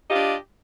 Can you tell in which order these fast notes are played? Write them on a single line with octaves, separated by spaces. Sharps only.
G4 D#5 F4 D4